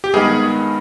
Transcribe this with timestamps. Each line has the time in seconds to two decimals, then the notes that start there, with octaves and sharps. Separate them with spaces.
0.04 G4
0.13 G2 D#3 G#3 B3 D#4 G#4